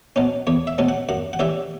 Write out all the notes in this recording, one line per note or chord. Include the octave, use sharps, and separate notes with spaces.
B2 F#3 C#4
E2 C#5
E5
B2 F#3 C#4
F#5
F#2 F#5
F#5
E3 G3 C#4 E5